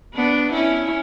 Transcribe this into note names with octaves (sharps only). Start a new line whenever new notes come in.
B3 D4
C#4 E4